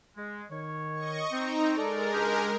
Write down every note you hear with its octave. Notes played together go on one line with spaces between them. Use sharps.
G#3
D#3 C#5
D#5 C#6
C4 D#4 A#5
G#3 A4 A#4 D5
C#2 D4 G4